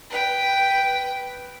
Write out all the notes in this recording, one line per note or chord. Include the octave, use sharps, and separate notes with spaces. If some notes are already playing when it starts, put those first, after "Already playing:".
B4 G5